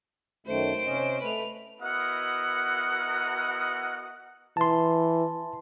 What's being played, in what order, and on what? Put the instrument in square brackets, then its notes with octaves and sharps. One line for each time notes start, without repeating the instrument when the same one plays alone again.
[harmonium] F#2 D#3 A3 [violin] C5 D7
[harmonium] C3 C#4 D#5
[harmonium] A3 [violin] B4 F7
[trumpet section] B3 E4 F#4 A#4 D#5 F#5
[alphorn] E3 [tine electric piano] A5 C6